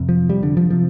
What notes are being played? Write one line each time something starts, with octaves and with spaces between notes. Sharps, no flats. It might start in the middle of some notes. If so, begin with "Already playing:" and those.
Already playing: F2 C3
F3
G3
D3
F3
C3 F3